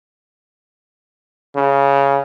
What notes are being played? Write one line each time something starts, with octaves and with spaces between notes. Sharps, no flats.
C#3